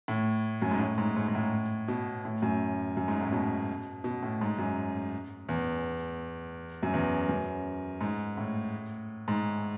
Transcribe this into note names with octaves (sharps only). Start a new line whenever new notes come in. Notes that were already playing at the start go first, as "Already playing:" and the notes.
A2
F#2
G#2
A2
G#2
G#2
G#2
A2
B2
A2
F#2
F#2
G#2
A2
B2
B2
A2
G#2
F#2
E2
F#2
E2
F#2
G#2
A2
G#2